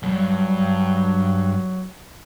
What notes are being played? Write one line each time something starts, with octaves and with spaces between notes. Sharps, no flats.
E2 G2 F#3